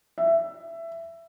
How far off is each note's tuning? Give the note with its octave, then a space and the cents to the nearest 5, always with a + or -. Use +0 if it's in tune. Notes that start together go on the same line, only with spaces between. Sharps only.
E5 +15